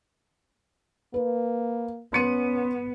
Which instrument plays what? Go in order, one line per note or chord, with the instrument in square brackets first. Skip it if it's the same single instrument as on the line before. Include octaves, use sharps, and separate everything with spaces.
[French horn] A#3 [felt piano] B4
[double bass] B3 [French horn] C#4 [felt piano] C6 C#7 D#7